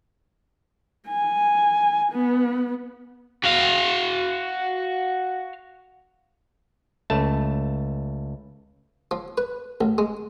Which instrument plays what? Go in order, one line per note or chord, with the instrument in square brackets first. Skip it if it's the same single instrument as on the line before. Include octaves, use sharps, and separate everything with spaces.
[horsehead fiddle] G#5
B3
[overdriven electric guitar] F#4 F5
[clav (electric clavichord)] C#2 A3 A5
[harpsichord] F3
B4
A1
G#3